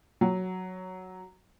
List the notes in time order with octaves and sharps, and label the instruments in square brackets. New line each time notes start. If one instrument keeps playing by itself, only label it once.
[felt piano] F#3